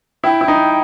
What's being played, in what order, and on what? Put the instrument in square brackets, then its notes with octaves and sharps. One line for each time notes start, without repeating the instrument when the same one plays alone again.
[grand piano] E4 [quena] G5
[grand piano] E4
D#4